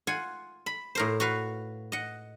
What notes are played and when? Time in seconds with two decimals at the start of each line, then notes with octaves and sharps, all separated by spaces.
0.07 F4 F#5 G#5
0.66 B5
0.95 A2 A#4 C5
1.20 F#4 B4 F5
1.92 D#5 F#5